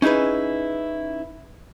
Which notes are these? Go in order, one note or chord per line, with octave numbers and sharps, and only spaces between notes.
C#4 D#4 E4 G#4 B4